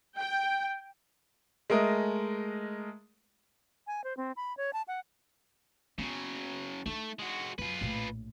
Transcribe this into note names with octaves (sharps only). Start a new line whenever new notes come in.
G5
G#3 A3 A#4 D#5
G#5
C5
C4
B5
C#5
A5
F#5
C#3 F#3 B3
A3 D4 D#4
G#3 F#4
F#2 F4 B4
A#1 A2